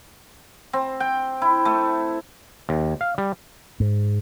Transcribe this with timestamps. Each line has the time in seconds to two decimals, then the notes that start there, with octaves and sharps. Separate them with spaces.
0.73 C4
1.00 G5
1.42 E4
1.65 A3
2.69 D#2
3.01 F5
3.18 G3
3.80 G#2